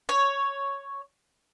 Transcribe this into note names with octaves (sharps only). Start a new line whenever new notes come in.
C#5